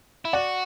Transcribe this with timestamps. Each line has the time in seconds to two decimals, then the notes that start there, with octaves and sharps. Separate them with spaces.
0.25 E4
0.33 F#4 D5 F#5